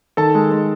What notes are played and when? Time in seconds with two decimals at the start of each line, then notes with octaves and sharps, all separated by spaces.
0.17 D#3 A4 A5
0.35 G#3
0.51 G#3